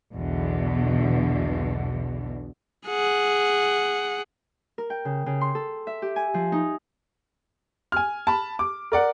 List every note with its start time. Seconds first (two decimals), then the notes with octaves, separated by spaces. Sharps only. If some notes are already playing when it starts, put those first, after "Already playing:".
0.15 B1 E2 B2 D3 E3
2.88 G#4 F#5
4.78 A#4
4.90 G5
5.05 C#3
5.26 C#3
5.41 C6
5.55 A4
5.87 E5
6.02 G4
6.16 G#5
6.34 F3
6.52 D#4
7.92 G#5 F6
8.27 A5 B5
8.59 D6
8.92 A#4 D5 F#5